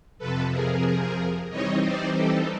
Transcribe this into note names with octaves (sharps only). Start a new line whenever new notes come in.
F2 C3 F3 A4 B4
G#4 A#4
E3 G3 C4 D#4 C#5 D#5
C5 D5
G4 A4